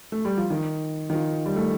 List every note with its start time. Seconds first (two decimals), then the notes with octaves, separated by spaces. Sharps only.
0.12 A3
0.25 G3
0.37 F3
0.50 D#3
1.10 D#3
1.14 F3
1.46 G3
1.56 A3